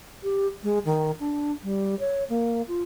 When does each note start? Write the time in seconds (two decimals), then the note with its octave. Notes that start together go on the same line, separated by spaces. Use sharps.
0.23 G4
0.63 G#3
0.85 D#3
1.20 D4
1.63 G3
2.00 C#5
2.30 A#3
2.68 F4